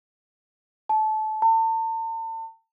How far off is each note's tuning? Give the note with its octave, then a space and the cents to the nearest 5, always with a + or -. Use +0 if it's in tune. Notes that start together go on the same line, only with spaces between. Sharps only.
A5 -25
A5 +40